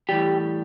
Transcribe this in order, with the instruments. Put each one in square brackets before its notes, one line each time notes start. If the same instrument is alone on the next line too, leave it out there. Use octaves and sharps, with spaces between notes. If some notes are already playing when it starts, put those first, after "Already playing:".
[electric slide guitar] A2 E3 G3 G4